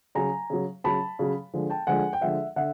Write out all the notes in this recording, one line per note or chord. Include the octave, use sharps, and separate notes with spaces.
C#3 F#3 G#5 A#5
C#3 F#3
C#3 F#3 A5 B5
C#3 F#3
D3 F3 G#3
G5 A5
D3 F3 G#3 F#5 G#5
G5
D3 F3 G#3 E5 F#5
D3 E5 F#5